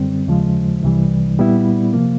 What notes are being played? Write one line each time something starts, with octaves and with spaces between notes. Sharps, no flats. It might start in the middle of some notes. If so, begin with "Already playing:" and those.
Already playing: F#2 D3 G3 C4
D#2 C#3 F3 G#3
C2 C3 E3 G3
A#2 G3 B3 E4
C3 F3 A#3